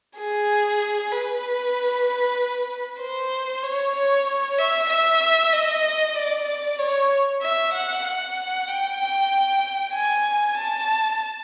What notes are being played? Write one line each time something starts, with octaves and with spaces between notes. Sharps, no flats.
G#4
B4
C5
C#5
C#5
C#5
E5
E5
D#5
D5
C#5
E5
F#5
F#5
G5
G#5
A5